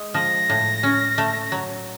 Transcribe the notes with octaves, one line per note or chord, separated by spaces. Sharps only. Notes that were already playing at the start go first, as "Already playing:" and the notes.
Already playing: G#3
F3 A#6
A2
C#4
A3
F#3